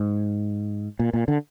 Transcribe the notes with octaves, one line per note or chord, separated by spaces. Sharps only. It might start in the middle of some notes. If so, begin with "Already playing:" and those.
Already playing: G#2
A#2
A#2
D3